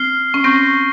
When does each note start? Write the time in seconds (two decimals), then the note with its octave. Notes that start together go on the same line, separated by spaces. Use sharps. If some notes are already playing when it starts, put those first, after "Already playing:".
Already playing: C4 F6 C7 G7
0.34 C#4
0.44 C4 C#6 G6 A#6